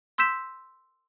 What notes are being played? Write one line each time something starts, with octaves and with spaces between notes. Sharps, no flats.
C6 E6 G6 B6 E7